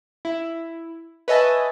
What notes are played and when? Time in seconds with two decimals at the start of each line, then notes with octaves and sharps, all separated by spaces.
0.25 E4
1.28 B4 C#5 D#5 E5 G#5 A5